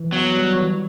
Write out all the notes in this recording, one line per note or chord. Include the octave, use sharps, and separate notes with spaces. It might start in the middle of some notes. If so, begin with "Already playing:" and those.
Already playing: E3
F#3 B3
G3
E3